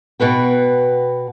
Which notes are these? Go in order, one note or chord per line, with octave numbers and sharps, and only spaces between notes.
B2 F#4 B4 G5